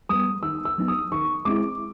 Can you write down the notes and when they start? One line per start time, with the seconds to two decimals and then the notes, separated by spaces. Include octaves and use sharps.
0.09 G3 B3 D#6
0.43 D#3 E6
0.65 E6
0.78 F#3 B3 D#4
0.88 D#6
1.12 D#3 C#6
1.45 G#3 C4 E4 D6